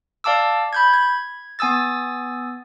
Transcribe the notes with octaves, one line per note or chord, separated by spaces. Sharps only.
D5 F5 A5 D6 E6
B5 G6 G#6
G#6
B3 G#5 D#6 E6 A6